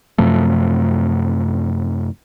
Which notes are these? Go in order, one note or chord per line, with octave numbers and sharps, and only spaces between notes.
F#2 C3 F3 A3